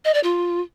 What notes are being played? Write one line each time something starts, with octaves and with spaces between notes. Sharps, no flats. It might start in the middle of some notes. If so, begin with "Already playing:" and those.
D#5
D5
F4